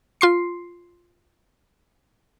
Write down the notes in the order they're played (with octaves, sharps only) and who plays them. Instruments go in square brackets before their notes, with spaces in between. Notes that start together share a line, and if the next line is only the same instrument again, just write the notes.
[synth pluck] F4 C6 C7